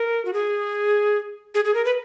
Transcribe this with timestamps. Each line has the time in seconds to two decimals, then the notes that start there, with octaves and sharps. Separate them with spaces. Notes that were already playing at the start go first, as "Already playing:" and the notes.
Already playing: A#4
0.25 F#4
0.33 G#4
1.55 G#4
1.65 G#4
1.74 A#4
1.85 B4